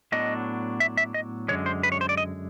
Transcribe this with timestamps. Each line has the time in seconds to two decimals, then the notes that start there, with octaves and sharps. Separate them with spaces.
0.12 A2 F#3 B3 D4 D#5
0.80 E5
0.97 E5
1.14 D#5
1.48 F#2 D3 F3 G#3 C#5
1.66 C5
1.83 B4
1.92 C#5
2.01 C5
2.09 D5
2.17 D#5